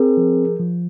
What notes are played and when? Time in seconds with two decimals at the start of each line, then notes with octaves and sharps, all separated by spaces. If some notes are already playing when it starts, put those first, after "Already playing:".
Already playing: C4 G#4 A#4
0.17 F3
0.59 F3